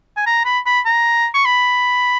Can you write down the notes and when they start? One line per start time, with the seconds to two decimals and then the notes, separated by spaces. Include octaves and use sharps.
0.17 G#5
0.26 A#5
0.45 B5
0.66 B5
0.85 A#5
1.34 C#6
1.45 B5